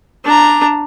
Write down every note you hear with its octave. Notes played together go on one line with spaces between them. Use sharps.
D4 A#5